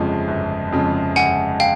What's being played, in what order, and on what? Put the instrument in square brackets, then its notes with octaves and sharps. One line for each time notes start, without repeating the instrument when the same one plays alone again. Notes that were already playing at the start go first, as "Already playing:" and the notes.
Already playing: [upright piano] G1 F2 C#3 F3 G#3
G1
F2 C#3 F3 G#3
[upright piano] G1 [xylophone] F#5 G#5
[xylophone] F5 G5